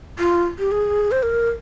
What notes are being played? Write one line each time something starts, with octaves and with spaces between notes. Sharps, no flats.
F4
G4
G#4
C5
A#4